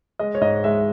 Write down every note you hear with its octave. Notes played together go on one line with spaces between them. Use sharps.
G#3 D#5
C#5
G#2 D#5
G#3 E5